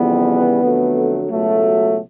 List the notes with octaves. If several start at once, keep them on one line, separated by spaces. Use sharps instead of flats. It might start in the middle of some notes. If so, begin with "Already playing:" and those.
Already playing: F2 C#3 E3 G3 B3
F2 D3 F#3 A3
C#2 B2 F#3 A3